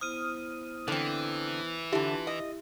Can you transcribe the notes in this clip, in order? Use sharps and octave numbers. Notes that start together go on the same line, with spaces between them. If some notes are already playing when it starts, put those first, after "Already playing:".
B3 E4 C5 D#6 F6 D#7
D3 E3 C4
D3 D4 E4 F4 G4 E5 A5
E4 D#5